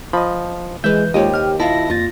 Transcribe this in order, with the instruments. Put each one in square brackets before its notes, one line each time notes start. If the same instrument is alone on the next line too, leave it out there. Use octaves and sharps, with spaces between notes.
[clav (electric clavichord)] F3 D#5 [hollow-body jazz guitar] B5
[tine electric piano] E3 G6 [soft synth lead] G#3 [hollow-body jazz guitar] B4 E5
[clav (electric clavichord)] D#2 [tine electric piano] G#3 F4 [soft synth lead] G4 [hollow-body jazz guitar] C5 C#5 D#5
[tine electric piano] G5 F6
[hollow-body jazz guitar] E4 F4 F5 [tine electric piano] D#5 A5 [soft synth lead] A#6
[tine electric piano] F2 A#3 A6 [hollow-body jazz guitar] F4